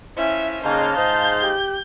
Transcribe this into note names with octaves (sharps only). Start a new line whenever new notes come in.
A2 F3 C#4 E4 E5
C#3 G#3 A#3 D#4 F4 C5 F5 A5
G#2 D#5 G6
G4